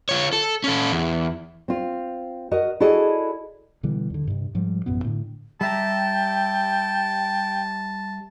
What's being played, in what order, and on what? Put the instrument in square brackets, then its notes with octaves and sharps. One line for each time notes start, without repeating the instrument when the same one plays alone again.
[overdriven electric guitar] F4 C#5
A4
C#4 A4
E2
[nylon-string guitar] C4 F4
F#4 A#4 D#5
E4 F#4 G#4 A4 D5 D#5
[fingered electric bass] B2 D3 E3 G3
D#2 D3
G2 C3
G#2 F3 G3
A1 F#2 B2 B3
A2 D3
[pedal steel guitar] G3 E5 A#5 [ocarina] G5 [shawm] A5